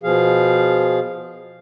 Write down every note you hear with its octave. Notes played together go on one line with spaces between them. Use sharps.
B2 F3 G#4 F5